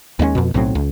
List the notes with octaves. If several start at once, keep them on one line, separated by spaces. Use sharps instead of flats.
D#2 G#3 A3 C#4
F2 B2
B1 A2 F#3 C4
C#2